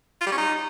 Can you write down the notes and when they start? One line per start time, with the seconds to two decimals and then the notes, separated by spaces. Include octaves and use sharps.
0.21 F4
0.27 G3
0.32 C#4
0.38 D#4